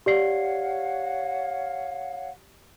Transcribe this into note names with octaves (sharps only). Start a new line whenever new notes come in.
G4 C#5 D5 F5 F#5 C7